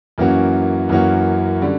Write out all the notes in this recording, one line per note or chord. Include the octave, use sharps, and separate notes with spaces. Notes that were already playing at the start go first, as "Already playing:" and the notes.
F#2 E3 A#3 C#4 F#4
F#2 E3 A#3 C#4 F#4
D3 G3 C#4